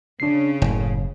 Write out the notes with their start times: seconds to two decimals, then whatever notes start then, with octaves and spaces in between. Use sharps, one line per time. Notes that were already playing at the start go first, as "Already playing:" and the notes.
0.20 C#3 D4 C7
0.62 F#1 A2